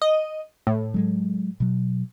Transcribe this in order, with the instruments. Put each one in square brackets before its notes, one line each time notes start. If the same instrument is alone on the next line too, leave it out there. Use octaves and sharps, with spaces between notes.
[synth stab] D#5
A2
[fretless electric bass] F#3 G#3
B2 F#3